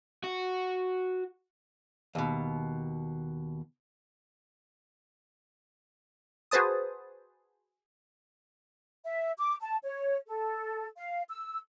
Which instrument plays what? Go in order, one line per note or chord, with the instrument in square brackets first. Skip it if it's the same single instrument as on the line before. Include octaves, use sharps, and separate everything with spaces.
[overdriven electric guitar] F#4
[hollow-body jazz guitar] D#2 B2
[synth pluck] F#4 G#4 B4 C5 A5 D#6
[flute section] E5
D6
A5
C#5
A4
F5
E6